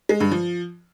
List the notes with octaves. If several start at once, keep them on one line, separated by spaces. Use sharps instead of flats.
G#3
G2
F3